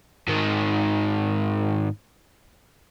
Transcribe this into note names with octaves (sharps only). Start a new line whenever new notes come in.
G#2 D#3